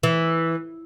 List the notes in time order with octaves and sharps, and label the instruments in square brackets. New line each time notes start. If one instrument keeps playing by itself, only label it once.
[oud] E3